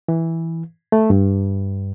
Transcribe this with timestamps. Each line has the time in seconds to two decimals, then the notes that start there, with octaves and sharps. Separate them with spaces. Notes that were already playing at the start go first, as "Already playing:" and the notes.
0.08 E3
0.92 A3
1.10 G2